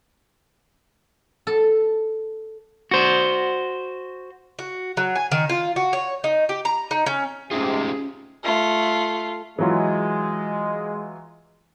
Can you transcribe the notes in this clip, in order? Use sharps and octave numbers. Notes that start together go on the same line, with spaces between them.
A4
F#4 C5
F#4
F#3
G#5
D#3
F4
F#4
C#5
D#4
G4
A#5
D#4
C#4
G#2 C3 A3 C#4 D#4 F4 G#4
A3 F4
E3 F#3 G#3 F4